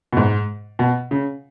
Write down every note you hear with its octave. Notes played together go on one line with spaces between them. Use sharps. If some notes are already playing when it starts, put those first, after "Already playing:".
B2
G#2
B2
C#3